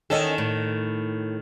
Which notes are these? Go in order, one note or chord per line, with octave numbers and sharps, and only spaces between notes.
E2 D#3 C#4 A4 D#5
A2